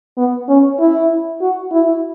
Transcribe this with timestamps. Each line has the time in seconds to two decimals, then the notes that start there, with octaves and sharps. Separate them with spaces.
0.17 B3
0.48 C#4
0.79 E4
1.41 F#4
1.72 E4